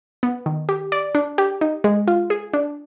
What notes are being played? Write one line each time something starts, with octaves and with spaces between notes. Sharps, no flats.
B3
D#3
G4
D5
D4
G4
D#4
G#3
F4
G#4
D4